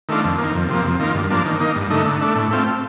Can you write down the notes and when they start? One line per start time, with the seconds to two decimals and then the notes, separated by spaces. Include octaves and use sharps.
0.09 D#3 A3 D4 F4
0.24 F2
0.38 A#3
0.43 D#3
0.55 F2
0.69 C3 F3 A#3
0.84 F2
1.00 D#3 A#3 F4
1.14 G2
1.30 F3 A#3 D4
1.45 D#3
1.60 A#3 D#4
1.75 G2
1.91 D3 A3 D#4
2.05 D3
2.21 A3 D4
2.35 A2
2.51 A3 C4 F4